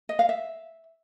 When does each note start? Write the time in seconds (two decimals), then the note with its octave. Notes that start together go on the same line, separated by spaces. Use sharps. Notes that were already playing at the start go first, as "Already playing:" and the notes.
0.09 D#5
0.19 F5
0.29 E5